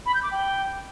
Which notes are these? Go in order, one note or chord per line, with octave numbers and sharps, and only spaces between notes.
B5
G6
D6
G5